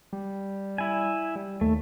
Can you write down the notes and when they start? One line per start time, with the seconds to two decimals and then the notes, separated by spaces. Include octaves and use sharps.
0.13 G3
0.78 E4 G#5
1.36 G3
1.61 D#2 A3